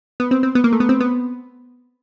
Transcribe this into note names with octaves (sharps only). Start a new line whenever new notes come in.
B3
C4
C4
B3
A#3
A3
B3
C4
B3